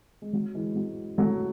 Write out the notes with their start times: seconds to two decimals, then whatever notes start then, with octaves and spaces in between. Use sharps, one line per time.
0.22 G#3
0.33 F#3
0.54 E3 G#3
0.75 F#3
1.18 F#3 A3